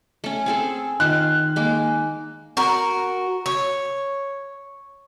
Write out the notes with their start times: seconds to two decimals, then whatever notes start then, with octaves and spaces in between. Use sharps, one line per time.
0.24 A3 C#4
0.46 C4 G#4 A4
1.00 D#3 F4 F#6
1.56 G#3 A#3
2.57 F#4 A#4
3.46 C#5